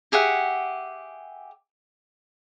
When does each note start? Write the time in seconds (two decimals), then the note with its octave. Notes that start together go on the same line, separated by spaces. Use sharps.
0.12 G4 G#4 E5 F#5